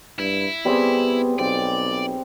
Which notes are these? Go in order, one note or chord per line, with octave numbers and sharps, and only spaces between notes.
G2 E4
G3 B3 C4 G#4
B1 C4 D5